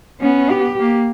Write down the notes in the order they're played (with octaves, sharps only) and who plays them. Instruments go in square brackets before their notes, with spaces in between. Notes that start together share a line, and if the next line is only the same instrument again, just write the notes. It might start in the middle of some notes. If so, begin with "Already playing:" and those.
[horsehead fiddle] B3 [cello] C#4
[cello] G4
[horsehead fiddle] A#3